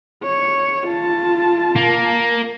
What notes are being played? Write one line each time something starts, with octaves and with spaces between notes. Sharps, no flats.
C#5
F4 A5
A#3